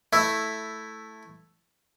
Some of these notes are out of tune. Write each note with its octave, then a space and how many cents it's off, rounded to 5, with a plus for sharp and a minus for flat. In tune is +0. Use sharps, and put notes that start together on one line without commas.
A3 +0 E4 +0